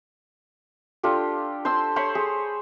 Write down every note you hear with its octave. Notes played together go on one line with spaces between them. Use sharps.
D4 F4 G4 A4
C5 A5 C6 E6
C5 C#5 B5 C6
G#4